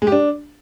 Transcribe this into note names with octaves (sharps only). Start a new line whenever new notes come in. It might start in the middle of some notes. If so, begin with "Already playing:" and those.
G#3
G4
D4